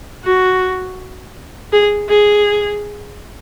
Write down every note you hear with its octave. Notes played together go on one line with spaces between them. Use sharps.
F#4
G#4
G#4